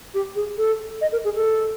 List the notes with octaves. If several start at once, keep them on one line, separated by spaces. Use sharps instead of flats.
G4
G#4
A4
D#5
A#4
G#4
A4